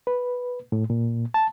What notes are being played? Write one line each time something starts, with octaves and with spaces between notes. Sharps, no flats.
B4
A2
A#2
A5